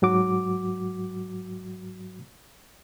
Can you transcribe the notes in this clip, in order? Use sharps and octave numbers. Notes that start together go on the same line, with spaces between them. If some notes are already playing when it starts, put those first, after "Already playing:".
G#2 F#3 F#4 D6